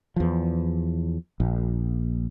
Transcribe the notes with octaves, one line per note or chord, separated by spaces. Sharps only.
E2 F3
A#1